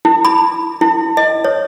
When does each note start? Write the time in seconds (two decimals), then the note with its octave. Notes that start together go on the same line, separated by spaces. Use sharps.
0.05 E4
0.25 B5
0.81 E4
1.17 D#5
1.44 C#5